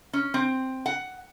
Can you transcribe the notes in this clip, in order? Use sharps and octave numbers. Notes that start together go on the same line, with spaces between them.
C#4
C4
F#5